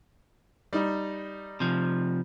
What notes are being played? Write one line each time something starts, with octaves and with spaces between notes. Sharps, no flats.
G3 D#4
C3 F3